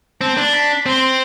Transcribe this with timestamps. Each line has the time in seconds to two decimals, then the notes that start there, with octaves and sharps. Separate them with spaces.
0.21 C4 A5
0.37 D4
0.53 B5
0.86 C4 C6